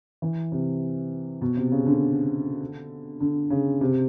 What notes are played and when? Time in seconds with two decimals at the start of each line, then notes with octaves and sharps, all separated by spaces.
0.22 E3
0.52 C3
1.41 B2
1.57 C3
1.71 C#3
1.86 D3
3.21 D3
3.50 C#3
3.81 C3